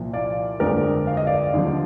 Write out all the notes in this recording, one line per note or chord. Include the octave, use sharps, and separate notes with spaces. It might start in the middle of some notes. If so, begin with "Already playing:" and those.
Already playing: C2 A#2 F3 A#3
D5 F5
G1 F2 D3 G#3 C4 A#4 D5
F5
D#5
D5 F5
D#2 D3 F3